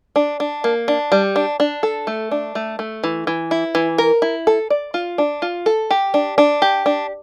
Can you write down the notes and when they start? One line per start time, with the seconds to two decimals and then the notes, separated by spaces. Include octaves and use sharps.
0.16 D4
0.40 D4
0.64 A#3
0.88 D4
1.12 G3
1.36 D4
1.60 D4
1.83 A4
2.07 A3
2.31 D4
2.55 A3
2.79 A3
3.04 E3
3.27 E3
3.51 E4
3.75 E3
3.98 A#4
4.22 E4
4.47 A4
4.70 D5
4.94 F4
5.18 D4
5.42 F4
5.66 A4
5.91 G4
6.14 D4
6.38 D4
6.62 G4
6.86 D4